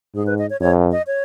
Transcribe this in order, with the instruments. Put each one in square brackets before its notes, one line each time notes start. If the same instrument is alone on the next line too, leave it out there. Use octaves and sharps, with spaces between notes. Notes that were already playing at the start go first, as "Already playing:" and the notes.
[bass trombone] G#2 [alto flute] G#4
[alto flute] B4
D#5
C#5
[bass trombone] F2 [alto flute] C#5
[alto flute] D#5
C#5